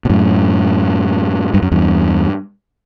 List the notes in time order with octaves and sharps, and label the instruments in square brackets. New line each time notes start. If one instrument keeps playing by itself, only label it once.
[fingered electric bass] B2
F#2 A2
G2
F#2
E2 G2